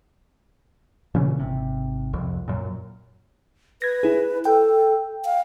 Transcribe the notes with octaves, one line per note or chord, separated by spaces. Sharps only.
A#2 C#3 E3 C#4
G#1 C3
C2 F2
F#2 A#2
B4 G#6 A#6
E4 G#4
A4 G5
F5